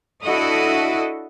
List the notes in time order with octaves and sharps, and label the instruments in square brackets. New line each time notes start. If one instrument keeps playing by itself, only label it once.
[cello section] D4 E4 F#4 A4 D#5